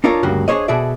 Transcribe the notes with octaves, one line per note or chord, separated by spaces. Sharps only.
D4 D#4 F4 A4 A#4 C#5
D2 G2 C#3 A#3 F#4
D4 G#4 A#4 C5 C#5 D#5
B2 F#4 G#4 A4 D5 E5